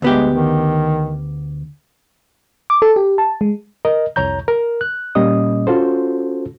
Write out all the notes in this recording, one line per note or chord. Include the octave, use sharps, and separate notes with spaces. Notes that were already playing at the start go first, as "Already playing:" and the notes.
D2 G#3 B3 G4
D#3
D6
A4
G4
A5
G#3
A#4 D#5
C2 F2 C#5 A#5 G6
A#4
F#6
A#2 G3 A#3 C#4 D#5 D#6
C#4 F4 F#4 A4 C5